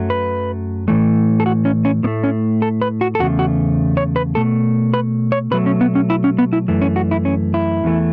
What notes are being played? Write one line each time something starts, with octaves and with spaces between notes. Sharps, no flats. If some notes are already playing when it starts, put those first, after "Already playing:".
Already playing: F#2 F#3 A3
B4
A2 E3 A3
A4
F#4
C#4
C#4
A2 A3 B3
C#4
A4
B4
F#4
A4
E2 C#3 A3 F#4
F#4
C#5
B4
B2 A3 A4
B4
C#5
B2 F#3 A3 B4
C#4
B3
C#4
E4
C#4
B3
E4
F#2 E3 A3
C#4
F#4
E4
C#4
E4
E2 E3 A3